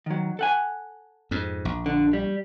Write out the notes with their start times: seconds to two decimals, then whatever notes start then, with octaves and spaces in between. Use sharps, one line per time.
0.06 D#3 F#3
0.39 A4 F#5 G#5
1.31 F2 G#2
1.65 A#1
1.86 D3
2.13 G3